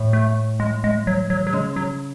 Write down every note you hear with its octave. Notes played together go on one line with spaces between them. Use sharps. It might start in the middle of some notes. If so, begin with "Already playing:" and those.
Already playing: A2
A3
G#3
G#3
F#3
F#3
F#3
C#3 G#3
F#3